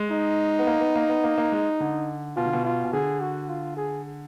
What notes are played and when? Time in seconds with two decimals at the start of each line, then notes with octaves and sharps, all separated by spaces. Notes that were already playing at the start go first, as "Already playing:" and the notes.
Already playing: G#3
0.11 D#4
0.59 B3
0.67 A#3
0.81 B3
0.95 A#3
1.09 B3
1.24 A#3
1.38 A#3
1.52 G#3
1.80 D3
2.37 B2 F4
2.45 D3
2.53 B2
2.65 F4
2.84 B2
2.93 D3 G#4
3.21 F#4
3.49 F4
3.77 G#4